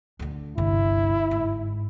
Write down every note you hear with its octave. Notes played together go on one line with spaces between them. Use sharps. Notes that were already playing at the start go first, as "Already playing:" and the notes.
D2 D3
G1 C2 G2 E4
G#2